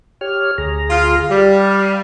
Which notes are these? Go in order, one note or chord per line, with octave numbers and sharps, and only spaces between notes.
G4 C#5 F6
D2 G#4 A#5
F4
G3 F5